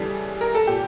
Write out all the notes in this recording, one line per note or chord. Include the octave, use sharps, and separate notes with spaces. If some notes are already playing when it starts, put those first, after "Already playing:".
Already playing: C#3 E3 G3 A4
A#4
A4
A#2 G4